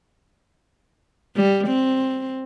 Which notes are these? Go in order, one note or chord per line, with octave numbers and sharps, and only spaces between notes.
G3
C4